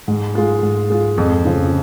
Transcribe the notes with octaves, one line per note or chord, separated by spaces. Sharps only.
G#2
G#3 F4
G#2
G#3 F4
F2
C#3 F3